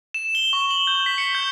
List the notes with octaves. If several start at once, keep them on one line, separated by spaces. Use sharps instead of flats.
E7
G7
C#6
F#7
G6
B6
C#7
G6